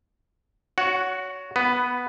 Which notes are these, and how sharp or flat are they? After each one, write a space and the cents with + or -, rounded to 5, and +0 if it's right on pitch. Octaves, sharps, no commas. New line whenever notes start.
F#4 +0 C#5 +25 F#5 +0
B3 +0 B4 +15